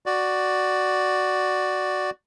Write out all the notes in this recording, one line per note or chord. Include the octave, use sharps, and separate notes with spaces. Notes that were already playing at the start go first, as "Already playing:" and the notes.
F#4 D5